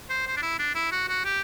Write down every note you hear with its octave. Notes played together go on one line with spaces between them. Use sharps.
C5
C5
D4
E4
D4
E4
F#4
F#4
G4